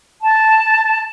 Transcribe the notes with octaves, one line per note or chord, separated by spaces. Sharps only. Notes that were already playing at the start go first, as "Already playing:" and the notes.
A5